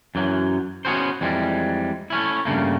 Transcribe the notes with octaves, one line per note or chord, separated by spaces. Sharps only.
F#2 E3 F#3
B3 C#4 F#4 G#4 A#4 C5
F2 E3 G3 G#3
A3 C#4 E4
G2 C#3 A3 A#3